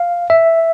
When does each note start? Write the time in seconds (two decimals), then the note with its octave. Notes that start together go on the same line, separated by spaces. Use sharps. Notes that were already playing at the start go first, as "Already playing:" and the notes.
Already playing: F5
0.30 E5